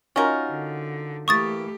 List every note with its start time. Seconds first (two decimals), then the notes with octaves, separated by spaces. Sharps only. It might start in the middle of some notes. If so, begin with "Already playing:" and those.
0.16 C#4 D#4 F4 F#4 A#4
0.49 D3
1.28 E3 A3 A#3 G4 C#6 D#6 A6